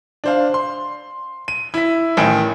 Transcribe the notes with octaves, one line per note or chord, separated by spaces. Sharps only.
D4 C5 F5
C6
D#7
E4 B6
A1 D#3 G#5 D7